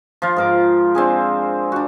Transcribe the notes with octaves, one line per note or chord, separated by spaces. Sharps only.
F3 F4
G#2 A#4 D6
C4 D4 G#4
D4 F#4